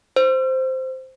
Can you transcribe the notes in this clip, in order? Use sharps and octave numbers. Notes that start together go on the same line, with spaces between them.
C5